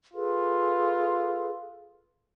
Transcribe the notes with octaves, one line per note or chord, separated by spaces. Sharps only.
F4 G#4 A4 B4